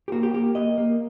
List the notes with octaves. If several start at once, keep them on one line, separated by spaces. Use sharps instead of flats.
G4
A#3 F#4
G4
A#3 G4
A#3 D#5
A#3